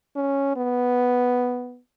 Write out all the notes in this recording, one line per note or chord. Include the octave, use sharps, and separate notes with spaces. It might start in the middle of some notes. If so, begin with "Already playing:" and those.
C#4
B3